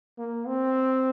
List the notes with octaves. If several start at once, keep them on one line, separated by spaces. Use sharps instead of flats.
A#3
C4